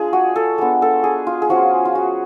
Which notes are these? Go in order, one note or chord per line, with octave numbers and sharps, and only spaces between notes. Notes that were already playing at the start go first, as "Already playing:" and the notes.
Already playing: G#3 D4 F4 G#4
F#4
A4
G#3 B3 D4
A4
G#4
F4
G#4
F3 G#3 C#4 F4 F#4
F4
F#4